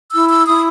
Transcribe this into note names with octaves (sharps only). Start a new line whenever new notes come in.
E4 E6
E6
E4 D#6